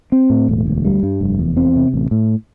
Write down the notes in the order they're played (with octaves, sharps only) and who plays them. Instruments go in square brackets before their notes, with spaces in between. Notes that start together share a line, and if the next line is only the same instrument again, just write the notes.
[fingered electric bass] C4
A2
E1
D2
G3
G2
F1
E2
C4
C3
A1
A2